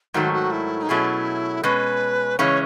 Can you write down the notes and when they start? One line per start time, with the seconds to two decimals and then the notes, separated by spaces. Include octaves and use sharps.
0.14 G#2 D#3 F#3 A3 F#4
0.33 F#4
0.52 E4
0.83 D#4
0.89 B2 F#3 A3 C#4 E4 G#4
1.63 B2 G#3 C#4 B4
2.39 C#3 E3 G#3 C#4 C#5